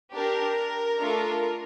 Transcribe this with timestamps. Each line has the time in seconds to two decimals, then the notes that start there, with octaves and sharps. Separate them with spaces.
0.15 D4 G4 A#4
1.00 A3 D4 F4 A4